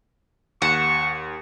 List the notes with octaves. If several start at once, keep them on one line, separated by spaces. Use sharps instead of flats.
D#2 F#5 C#6 E7